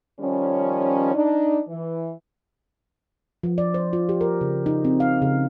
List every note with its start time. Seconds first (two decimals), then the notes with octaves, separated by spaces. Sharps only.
0.20 D#3 F3 G3 C#4
1.14 D4 D#4
1.68 E3
3.43 F3
3.58 D5
3.74 C5
3.93 F4
4.09 G4
4.21 A#4
4.41 C#3
4.66 D#4
4.85 C4
5.00 F5
5.22 C#3